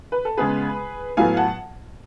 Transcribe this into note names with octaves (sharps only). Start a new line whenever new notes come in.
B4
A4
C#3 G#3 B3 G#4 B4
A2 F#3 B3 F5 G#5
F#5 A5